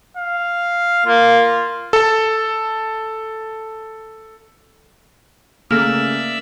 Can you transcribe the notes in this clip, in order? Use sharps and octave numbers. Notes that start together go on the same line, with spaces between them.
F5
A#3 F4
A4 A5
C#3 A3 A#3 D5 E5 E6 F6